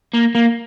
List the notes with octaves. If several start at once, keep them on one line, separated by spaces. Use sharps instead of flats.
A#3
A#3